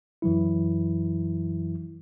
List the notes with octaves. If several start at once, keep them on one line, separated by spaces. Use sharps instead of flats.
F#2 E3 F#3 E4